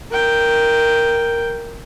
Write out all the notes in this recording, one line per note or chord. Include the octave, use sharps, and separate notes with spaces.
A#4 G5